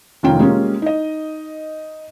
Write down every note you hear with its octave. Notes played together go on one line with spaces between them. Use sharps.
F1 D#3 C#4 F4 G5
G3 G#3 A#3 C#4 F4
D#4 D#5